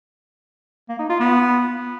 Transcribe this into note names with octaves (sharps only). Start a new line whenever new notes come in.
A#3
D#4
F4
B3